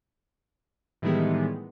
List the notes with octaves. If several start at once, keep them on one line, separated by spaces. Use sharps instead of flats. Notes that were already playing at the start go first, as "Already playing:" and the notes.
A2 D#3 E3 G3 G#3 B3